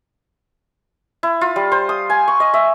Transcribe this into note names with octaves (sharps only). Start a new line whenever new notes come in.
E4
F4
G3
C5
D#6
G#5
C#6
D#5
E5